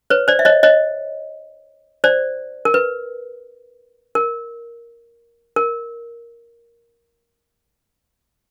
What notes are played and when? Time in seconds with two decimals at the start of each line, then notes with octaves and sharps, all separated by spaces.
0.10 B4 C#5
0.28 C5 D5
0.39 E5
0.45 C#5 D#5
0.63 C#5 D#5
2.04 C5 D5
2.65 A#4
2.74 B4
4.15 A#4
5.56 A#4